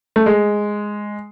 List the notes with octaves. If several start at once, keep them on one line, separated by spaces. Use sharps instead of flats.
A3
G#3